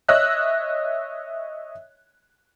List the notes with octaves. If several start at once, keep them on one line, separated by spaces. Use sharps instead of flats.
C#5 D#5 E5 E6 F#6